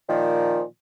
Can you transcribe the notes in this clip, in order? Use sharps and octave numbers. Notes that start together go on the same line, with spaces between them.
A#2 D#3 F3